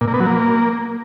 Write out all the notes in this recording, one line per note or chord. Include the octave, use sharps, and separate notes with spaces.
A#2
A#3
B3
F#3
A#3